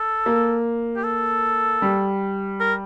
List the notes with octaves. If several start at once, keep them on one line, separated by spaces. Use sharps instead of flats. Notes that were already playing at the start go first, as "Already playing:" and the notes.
Already playing: A4
A#3
G4
A4
G3
A#4